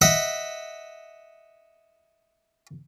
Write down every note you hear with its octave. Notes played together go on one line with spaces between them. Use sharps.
D#5 E5 F#5